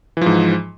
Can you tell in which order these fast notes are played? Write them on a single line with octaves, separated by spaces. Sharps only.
E3 F3 G#2